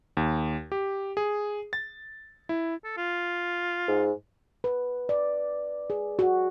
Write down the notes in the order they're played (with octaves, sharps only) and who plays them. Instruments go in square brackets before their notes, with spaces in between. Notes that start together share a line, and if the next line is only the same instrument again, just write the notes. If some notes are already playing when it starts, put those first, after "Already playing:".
[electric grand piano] D#2
G4
G#4
A6
E4
[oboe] A4
F4
[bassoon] G#2
[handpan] B4
D5
G#4
F#4